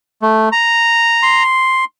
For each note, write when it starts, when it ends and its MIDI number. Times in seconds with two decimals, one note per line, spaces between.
0.22 0.49 57
0.52 1.43 82
1.23 1.85 84